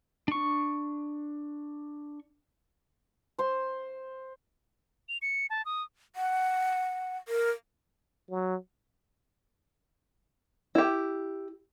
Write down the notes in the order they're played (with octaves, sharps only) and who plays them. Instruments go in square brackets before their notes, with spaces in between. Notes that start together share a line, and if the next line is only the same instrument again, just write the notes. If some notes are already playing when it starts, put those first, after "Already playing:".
[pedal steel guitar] D4 C#6
[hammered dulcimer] C5 C6
[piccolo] F7
C#7
A5
D#6
[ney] F#5
A#4
[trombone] F#3
[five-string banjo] E4 G4